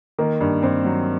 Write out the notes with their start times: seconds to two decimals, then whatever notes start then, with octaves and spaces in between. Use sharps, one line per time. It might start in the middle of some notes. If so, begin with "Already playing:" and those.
0.19 D#3 A#3
0.41 G2
0.63 G2 C4
0.85 F#3